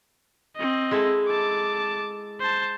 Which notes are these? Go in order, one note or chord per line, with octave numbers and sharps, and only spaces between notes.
C4 D#5
G#3 E4 A4
A5 D6
C5 A5